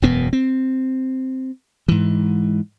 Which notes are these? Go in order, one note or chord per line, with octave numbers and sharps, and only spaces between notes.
E1 F#2 B2 B3
C4
G#2 E3